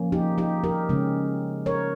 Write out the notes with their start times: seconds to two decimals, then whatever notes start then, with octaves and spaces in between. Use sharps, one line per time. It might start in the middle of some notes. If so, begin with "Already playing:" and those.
Already playing: F3 A#3 C#4
0.12 D#4 G4
0.38 D#4 G4
0.64 G4 A#4
0.89 C#3 G#3 C#4
1.66 A#4 C#5